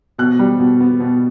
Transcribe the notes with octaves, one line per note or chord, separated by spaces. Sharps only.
B2 F#6
G3
B2
B3
B2